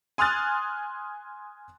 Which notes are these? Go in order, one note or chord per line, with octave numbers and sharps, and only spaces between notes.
G#5 C6 D#6 F6 F#6 A6